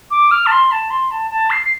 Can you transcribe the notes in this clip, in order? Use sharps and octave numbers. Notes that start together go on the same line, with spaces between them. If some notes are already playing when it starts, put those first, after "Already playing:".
D6
F6
A5
C6
A5
C6
A5
A5
C7
C7